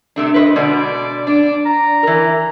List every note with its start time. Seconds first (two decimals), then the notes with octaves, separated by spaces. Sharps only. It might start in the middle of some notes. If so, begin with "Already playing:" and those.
0.16 C3 A3 D4
0.34 B4 C5 D#5
0.56 B2 D3 G#3 D5
1.27 D4 D5
1.65 A#5
2.03 E3 A#4